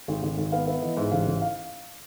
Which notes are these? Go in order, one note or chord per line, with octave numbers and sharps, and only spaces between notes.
G#1
G#1
G#1
B3 F5
B3 E5
E3 D#5
G#2 E5
A1 F5
A1
F5